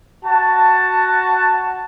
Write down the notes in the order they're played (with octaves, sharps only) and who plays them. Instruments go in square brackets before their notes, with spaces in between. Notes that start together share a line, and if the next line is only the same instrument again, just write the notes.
[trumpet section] F#4 A5